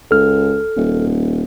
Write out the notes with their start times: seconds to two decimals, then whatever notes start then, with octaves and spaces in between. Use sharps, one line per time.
0.11 C#2 A4 F6
0.76 D#1